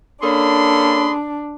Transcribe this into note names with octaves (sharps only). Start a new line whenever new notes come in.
A#3 C#4 D4 G#4 A4 B5 C6